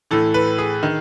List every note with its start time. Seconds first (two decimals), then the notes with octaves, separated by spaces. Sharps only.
0.11 A2 E3 A4
0.34 B4
0.58 G#4
0.83 D#3